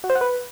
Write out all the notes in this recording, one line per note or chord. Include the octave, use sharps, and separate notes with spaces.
F#4
C5
F#5
B4